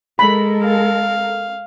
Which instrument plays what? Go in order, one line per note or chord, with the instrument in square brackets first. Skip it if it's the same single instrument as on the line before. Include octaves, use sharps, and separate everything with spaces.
[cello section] G#3 A4 A#4 [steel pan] B5
[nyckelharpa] F5